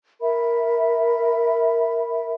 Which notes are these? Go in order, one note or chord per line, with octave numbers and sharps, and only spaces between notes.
A#4 E5 B5